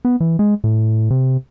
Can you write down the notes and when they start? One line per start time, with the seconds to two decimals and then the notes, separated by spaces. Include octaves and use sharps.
0.05 B3
0.20 E3
0.39 G#3
0.64 A2
1.10 C3